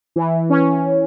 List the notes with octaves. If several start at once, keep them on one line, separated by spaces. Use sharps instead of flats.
E3
C#4